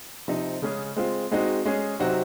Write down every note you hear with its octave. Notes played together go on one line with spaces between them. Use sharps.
C3 F3 C4 D#4
C#3 G#3 C#4 G#4
G#3 C4 F4
G#3 C4 D#4 F#4
G#3 C#4 G#4
C3 F#3 C4 D#4 F#4